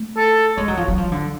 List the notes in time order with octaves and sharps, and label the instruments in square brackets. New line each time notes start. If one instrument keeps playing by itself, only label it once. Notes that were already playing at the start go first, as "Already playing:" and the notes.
Already playing: [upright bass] A3
[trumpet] A4
[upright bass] G#3 [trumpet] C#5
[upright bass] F#3
F3
F#3
F3
D3